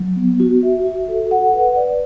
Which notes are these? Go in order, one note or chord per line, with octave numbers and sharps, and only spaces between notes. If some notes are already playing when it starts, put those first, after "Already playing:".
Already playing: F#3
B3
F#4
E5
F#4
A4
F#5
B4
D5